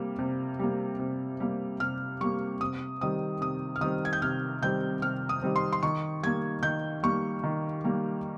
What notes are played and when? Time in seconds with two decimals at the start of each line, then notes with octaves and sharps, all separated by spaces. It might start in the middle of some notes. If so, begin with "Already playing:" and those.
Already playing: C3 G3 A#3
0.19 C3
0.59 G3 A#3
0.99 C3
1.40 G3 A#3
1.80 C3 F6
2.21 G3 A#3 C#6
2.60 C3 D#6
3.01 D#3 G3 C4 D#6
3.41 C3 D#6
3.76 F6
3.81 D#3 G3 C4 D#6
4.05 G#6
4.13 G6
4.22 C3 F6
4.63 D#3 G3 C4 G6
5.02 C3 F6
5.29 D#6
5.43 D#3 G3 C4
5.56 C6
5.73 C6
5.83 D#3 C#6
6.23 G3 A#3 G#6
6.63 D#3 G6
7.03 G3 A#3 C#6
7.44 D#3
7.84 G3 A#3